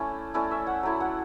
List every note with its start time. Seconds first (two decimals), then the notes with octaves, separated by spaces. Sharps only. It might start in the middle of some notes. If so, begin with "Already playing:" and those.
Already playing: A3 C#4 E4 D5
0.34 A3 C#4 E4 D5
0.51 E5
0.67 F#5
0.83 F#3 A3 E4
1.00 F#5